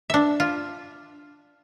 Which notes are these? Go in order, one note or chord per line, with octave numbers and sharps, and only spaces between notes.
D4 E5
F4